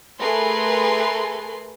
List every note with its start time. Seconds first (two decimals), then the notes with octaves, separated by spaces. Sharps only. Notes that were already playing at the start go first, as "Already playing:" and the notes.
0.20 A3 G#4 A#4 B4 C6